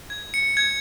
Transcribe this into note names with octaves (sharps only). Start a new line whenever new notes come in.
G#6
C#7
G#6